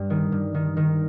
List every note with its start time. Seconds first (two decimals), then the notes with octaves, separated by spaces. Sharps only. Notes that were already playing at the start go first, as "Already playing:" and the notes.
Already playing: G2
0.10 D#3
0.32 G2
0.54 D#3
0.77 D#3